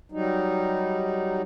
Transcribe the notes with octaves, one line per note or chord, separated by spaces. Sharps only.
F#3 G3 D#4